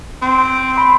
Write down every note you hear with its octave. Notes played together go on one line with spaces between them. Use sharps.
C4
B5 C6